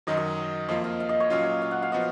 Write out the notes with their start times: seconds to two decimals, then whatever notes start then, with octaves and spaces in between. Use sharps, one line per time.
0.07 F#2 D#3 F#3 D#5
0.17 D#5
0.69 F2 F3 A#3 F4 D#5
0.84 F5
1.00 F5
1.09 D#5
1.20 C#5
1.30 A#2 F#3 C#4 F4 F5
1.46 F5
1.62 F5
1.71 F#5
1.82 F5
1.92 F3 B3 F#4 D#5